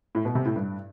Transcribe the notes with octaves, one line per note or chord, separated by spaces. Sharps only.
A2
B2
C3
A2
G2